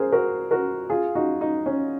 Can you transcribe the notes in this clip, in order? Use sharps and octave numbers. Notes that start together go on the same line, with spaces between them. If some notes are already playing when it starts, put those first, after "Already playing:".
Already playing: G#4 A#4 C5
F#4 A#4
F#4 A#4
F4 G#4
D#4 F#4
D#4
C#4